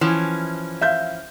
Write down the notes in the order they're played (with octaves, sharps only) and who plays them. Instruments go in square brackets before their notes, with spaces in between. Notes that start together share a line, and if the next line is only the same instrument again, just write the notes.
[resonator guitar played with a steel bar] E3 F3 C#4
[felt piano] E5 F5 G6